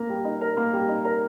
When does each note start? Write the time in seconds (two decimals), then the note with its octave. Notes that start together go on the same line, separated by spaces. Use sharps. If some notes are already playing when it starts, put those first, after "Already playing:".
Already playing: A#3 A#4
0.09 G3
0.25 D#4
0.41 A#4
0.57 A#3
0.73 G3
0.88 D#4
1.05 A#4